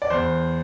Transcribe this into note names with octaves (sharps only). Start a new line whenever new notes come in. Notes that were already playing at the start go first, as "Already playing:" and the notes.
D5
E2 C5